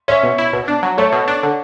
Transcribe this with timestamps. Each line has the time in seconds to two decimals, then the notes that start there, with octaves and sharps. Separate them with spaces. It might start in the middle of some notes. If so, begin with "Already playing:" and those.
0.08 C#4 C#5 E5
0.23 B2
0.38 E4
0.53 B2
0.68 D4
0.83 F#3
0.97 A3 A4 C#5
1.12 B2
1.28 D4
1.43 D3